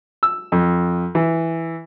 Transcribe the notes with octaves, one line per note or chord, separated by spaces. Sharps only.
E6
F2
E3